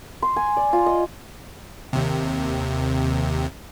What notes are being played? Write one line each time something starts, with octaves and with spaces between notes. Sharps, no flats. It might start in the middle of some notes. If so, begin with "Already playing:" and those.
C6
G#5
D5
F4
D#5
D#2 C3